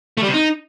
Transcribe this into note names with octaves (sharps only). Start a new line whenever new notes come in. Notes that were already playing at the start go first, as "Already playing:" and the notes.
A3
G3
C3
D#4